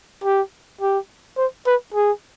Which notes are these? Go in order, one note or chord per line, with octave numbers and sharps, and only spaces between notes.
G4
G4
C5
B4
G#4